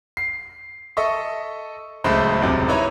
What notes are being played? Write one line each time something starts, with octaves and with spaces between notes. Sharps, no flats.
C7
A4 D#5 E5 C#6
D1 C#2 G#3 A3 C5 B5
D#1 C#2 F#2 C3
D#4 E4 B4 C#5 D#5 A#5